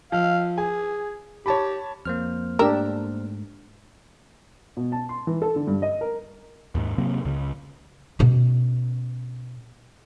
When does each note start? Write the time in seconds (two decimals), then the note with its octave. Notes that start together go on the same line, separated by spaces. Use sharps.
0.12 F3 F5
0.58 G#4 G#5
1.46 G4 C#5 A5 B5
2.05 F2 A#3 C5 F6
2.59 G#2 A3 D4 G4 A#4 E6
4.77 B2
4.92 A5
5.09 C6
5.27 E3
5.42 A4
5.56 D3
5.67 G2
5.82 D#5
6.01 A#4
6.75 D#2 G#2
6.98 C3 F#3 A#3 C4
7.25 C#2 C#3
8.19 B2 C#4